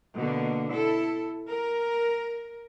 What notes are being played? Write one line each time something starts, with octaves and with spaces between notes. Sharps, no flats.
B2 D3 A#3
E4 A4
A#4